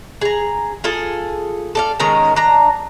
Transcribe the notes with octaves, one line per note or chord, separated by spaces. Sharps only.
G#4 A#5
F4 G#4 A4
A4 D5 F5
D#3 G#3 C#4 A#5
D4 A#5